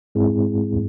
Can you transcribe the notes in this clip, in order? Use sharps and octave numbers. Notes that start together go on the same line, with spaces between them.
G#2 G#3 C4 E4 G#4